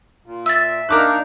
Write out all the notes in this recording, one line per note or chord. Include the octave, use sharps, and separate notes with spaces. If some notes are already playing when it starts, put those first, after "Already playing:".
A#2
E5 E6 A6
A#3 D4 D#4 A#4 D6 F#6